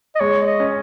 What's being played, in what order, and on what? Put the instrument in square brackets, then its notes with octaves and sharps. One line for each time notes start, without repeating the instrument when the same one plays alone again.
[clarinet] D#5
[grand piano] G#3 [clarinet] C#5
[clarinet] D#5
[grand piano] C#4